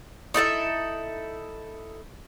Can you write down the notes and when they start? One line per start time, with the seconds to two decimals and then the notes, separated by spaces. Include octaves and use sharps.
0.34 D#4 E4 A4 E5